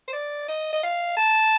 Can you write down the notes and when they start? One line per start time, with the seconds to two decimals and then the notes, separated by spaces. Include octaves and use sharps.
0.08 C5
0.13 D5
0.48 D#5
0.73 D#5
0.83 F5
1.17 A5